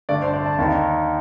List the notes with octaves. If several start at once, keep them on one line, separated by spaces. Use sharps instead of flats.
G2 D3 A3 D5
C5
D5
A5
D#2 D#3 A#3 D#4